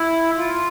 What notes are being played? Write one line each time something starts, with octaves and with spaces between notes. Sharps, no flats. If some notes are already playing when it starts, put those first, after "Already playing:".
Already playing: E4
F4